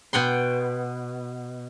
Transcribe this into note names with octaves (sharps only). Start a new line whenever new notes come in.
B2 F#5 G5 C6